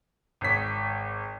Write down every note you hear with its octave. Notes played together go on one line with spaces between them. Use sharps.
G#1 C#5 B6